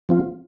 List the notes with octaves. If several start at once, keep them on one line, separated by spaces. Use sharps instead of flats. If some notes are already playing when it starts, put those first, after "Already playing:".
F3 C4 F4